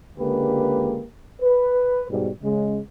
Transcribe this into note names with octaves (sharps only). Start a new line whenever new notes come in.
C#2 D3 G#3 A#3 G4 B4
B4
G#2 B2 G3
C#3 G#3